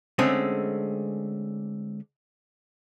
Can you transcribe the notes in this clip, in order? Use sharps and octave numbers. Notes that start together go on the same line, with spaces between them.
D3 G#3 A3 C4 C#4